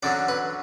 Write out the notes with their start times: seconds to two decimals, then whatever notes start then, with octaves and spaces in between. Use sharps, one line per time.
0.03 F#2 D3 F#3 D5
0.28 B4